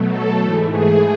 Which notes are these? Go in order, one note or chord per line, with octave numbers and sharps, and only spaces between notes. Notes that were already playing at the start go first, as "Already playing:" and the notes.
Already playing: B2 F#3 A3
A4
G#2 E3 A3 A4
G#4